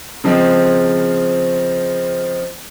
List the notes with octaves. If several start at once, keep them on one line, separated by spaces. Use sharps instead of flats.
C#3 F3 G#3 C4